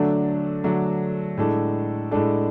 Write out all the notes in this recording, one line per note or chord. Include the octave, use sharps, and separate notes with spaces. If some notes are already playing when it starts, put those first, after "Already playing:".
Already playing: D3 F#3 A3 D4
D3 F#3 A3 D4
A2 G#3 D4 A4
A2 G#3 D4 A4